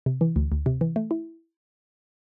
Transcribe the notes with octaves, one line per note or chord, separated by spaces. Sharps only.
C3
E3
D2
D2
C3
E3
A3
E4